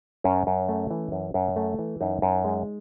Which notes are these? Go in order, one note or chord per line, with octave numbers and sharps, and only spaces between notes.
F#2 C#4
F#2
A3
E3
F#2
F#2
A3
E3
F#2 D#4
F#2
G#3